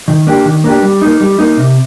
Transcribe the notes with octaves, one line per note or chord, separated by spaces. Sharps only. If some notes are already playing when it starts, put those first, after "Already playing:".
D#3
A#3 D4 G4
D#3
A#3 D4 G4
G3
A#3 D#4
G3
A#3 D#4
C3